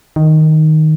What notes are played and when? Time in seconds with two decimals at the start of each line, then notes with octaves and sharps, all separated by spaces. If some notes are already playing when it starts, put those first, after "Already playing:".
0.16 D#3